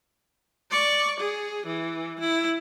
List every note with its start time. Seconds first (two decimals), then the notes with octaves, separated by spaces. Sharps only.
0.71 D5 C#6
1.20 G#4
1.66 E3
2.20 E4